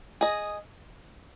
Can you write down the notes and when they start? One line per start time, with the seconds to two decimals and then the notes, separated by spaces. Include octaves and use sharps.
0.21 G#4 D#5